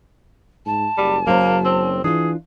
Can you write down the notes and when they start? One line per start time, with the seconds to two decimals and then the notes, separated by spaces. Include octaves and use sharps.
0.66 G#2 A5
0.98 F#1 G3
1.27 F#3 A#3 C#4 C5
1.65 C4
2.04 E3 D4 F4 G#4